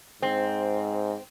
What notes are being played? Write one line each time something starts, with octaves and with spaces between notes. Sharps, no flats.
G#2 C4